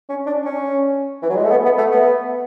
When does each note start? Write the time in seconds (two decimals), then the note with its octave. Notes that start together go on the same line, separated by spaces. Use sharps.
0.09 C#4
0.26 D4
0.45 C#4
1.22 E3
1.30 F#3
1.36 G#3
1.44 A3
1.51 B3
1.65 B3
1.78 A3
1.92 B3